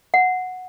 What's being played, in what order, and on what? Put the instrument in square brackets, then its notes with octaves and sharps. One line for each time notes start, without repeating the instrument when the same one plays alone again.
[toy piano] F#5